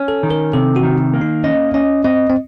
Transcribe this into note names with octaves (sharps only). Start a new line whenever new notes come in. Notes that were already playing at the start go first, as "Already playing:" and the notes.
Already playing: C#4
A4
D#3
A#4
C3 A4
F#4
D#3
A#3
D#4
C#4 D#5
C#4 D#5
C4 D#5
C4